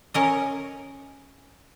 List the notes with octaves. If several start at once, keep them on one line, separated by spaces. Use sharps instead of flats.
C#4 A#4 D#5